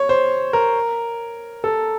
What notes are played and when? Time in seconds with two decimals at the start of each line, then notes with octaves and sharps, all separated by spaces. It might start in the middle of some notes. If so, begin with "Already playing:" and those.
Already playing: C#5
0.09 C5
0.53 A#4
1.64 A4